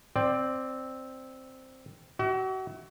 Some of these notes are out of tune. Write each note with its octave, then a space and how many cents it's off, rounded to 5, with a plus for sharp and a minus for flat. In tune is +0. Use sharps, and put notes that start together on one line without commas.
C4 +0 D5 +15
F#4 +35 E5 -25